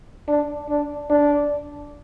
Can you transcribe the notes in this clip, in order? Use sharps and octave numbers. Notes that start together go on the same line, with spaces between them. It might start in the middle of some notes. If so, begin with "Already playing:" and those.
D4
D4
D4